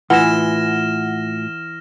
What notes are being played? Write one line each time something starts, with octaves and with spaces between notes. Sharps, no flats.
A2 E3 F4 F#5 G#5 F6 A#6 E7